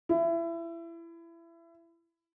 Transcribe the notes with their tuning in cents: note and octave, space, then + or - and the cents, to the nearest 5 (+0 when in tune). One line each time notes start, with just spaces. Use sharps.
E4 +25